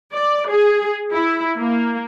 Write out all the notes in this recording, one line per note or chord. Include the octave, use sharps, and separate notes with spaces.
D5
G#4
E4
A#3